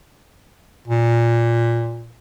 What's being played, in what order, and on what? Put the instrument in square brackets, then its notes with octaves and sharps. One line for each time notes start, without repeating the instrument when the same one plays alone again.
[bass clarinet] A#2